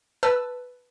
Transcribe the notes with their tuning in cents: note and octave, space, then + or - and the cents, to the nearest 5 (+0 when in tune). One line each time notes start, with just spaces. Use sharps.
B4 +0 A5 +0 E6 +10